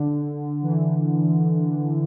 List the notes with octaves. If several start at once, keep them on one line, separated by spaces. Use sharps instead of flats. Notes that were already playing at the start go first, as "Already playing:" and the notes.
Already playing: D3
E3